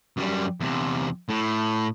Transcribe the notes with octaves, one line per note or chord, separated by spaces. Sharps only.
F#2 G3
E2 C3
A2